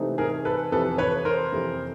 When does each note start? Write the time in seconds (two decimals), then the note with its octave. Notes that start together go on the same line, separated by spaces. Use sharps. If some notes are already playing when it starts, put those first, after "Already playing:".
Already playing: C3 E3 A3 C4 D#4
0.18 G#4 A#4
0.45 A4 B4
0.72 F2 C3 E3 A4 B4
0.98 B4 C#5
1.25 A#4 C5
1.52 F2 C3 E3